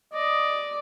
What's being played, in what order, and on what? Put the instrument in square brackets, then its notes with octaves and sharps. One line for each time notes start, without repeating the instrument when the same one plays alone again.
[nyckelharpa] D5 [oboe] D#5